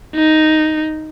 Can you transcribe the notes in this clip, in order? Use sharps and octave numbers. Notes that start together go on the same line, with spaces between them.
D#4